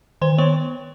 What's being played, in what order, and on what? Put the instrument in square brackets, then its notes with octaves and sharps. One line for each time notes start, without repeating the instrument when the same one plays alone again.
[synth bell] D#3 C5 C6
B3 C#5 C#6